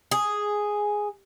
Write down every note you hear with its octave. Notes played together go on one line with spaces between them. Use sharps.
G#4